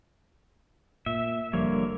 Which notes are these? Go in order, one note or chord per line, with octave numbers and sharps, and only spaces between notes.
A#2 E5
F1 D3 F3 G3 A#3 C#5